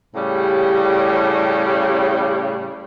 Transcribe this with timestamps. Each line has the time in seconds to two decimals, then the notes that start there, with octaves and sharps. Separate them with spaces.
0.14 A2 C#3 G3